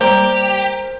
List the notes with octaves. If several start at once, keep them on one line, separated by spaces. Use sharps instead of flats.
G3 A#3 G4 A#4 C5 D5